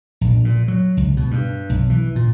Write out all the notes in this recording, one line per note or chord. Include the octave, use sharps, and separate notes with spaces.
A#1
A#2
F#3
C#2
B2
G2
B1
E3
A#2